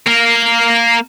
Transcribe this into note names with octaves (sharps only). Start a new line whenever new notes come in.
A#3 A#4